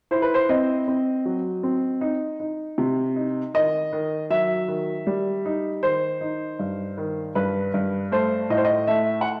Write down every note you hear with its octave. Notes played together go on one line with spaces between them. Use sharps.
E4 C5
B4
C5
C4 D#5
C4
F#3
C4
D#4
D#4
C3
D#4
D#3 D#5
D#3
F#3 E5
D#3
G3
D#4
D#3 C5
D#4
G2
D#3
G2 B4
G2
A3 C5
A2 D#5
C5
D#5
A3 E5
F#5